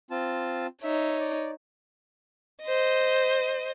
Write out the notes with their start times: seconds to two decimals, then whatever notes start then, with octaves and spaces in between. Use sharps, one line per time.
0.11 C4 F4 A5
0.83 D#4 C#5 E5
1.20 D5
2.63 C5 D#5